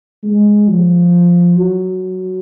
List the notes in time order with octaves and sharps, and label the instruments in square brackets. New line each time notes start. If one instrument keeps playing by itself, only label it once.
[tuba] G#3
F3
F#3